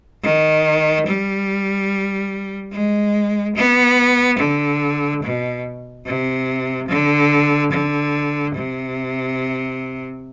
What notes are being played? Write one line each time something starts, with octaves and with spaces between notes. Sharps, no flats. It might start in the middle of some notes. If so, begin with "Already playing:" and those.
D#3
G3
G#3
B3
D3
B2
C3
D3
D3
C3